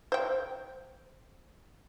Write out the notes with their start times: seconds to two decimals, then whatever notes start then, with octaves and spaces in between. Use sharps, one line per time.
0.12 C5 G5